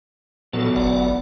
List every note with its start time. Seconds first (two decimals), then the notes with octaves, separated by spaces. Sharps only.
0.53 E2 A#2 F#3 B3 A4
0.76 G1 D5 F#5